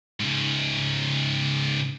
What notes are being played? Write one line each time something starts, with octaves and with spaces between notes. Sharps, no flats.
G#2 C#3